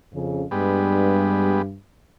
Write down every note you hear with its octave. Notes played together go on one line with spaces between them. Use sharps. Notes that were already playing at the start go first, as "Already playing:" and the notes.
F2 C#3
G2 G3 G#3 B3